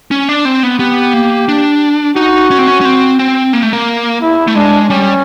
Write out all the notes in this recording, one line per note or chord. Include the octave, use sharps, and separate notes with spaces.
C#4
D4
C4
B3
B3 G4
A#3
D4
D#4 F#4
C#4
C4
C#4
C#4
C4
C4
A#3
A3
A#3
E4
A3
G#3 D4
G3 C#4